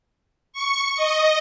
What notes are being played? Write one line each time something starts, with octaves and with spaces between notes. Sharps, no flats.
C#6
D#5